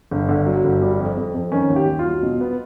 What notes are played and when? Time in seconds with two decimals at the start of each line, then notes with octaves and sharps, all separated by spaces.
0.11 G1
0.29 D3
0.46 F#3
0.64 G1
0.82 G3
0.99 F2
1.17 F2
1.35 F2
1.52 D#3 C#4
1.70 D#2
1.76 G4
1.88 D#2
1.99 F4
2.05 F#3
2.23 B2
2.41 B3